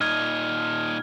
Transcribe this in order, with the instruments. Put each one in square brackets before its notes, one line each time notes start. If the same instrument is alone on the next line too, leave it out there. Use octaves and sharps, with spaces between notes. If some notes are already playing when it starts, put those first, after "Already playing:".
[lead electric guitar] A#2 D#4 [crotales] F6 G#6